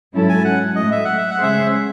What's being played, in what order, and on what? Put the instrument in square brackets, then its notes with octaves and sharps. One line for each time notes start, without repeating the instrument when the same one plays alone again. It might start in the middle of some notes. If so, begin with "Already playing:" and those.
[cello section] G#2 F#3 C#4 E4 A4
[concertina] G#5
F#5
[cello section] A2 F#3 A3 [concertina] D#5
[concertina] E5
F#5
E5
F#5
[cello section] C#3 G#3 C#4 G#4 C5 [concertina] E5